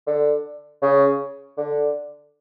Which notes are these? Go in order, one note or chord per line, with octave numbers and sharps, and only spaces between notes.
D3
C#3
D3